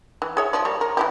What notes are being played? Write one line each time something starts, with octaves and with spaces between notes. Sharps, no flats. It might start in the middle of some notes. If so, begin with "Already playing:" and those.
E3
G#4 C#5 E5
F3 D5
G3 A#3 C#5
A#4
E3 E4 G4